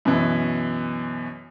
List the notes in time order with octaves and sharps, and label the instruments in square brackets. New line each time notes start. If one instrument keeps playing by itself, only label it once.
[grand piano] F#2 B2 E3